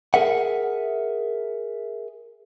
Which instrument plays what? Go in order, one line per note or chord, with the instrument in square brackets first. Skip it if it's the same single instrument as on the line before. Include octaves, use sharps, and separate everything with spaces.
[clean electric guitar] G#4 A#4 E5 F#5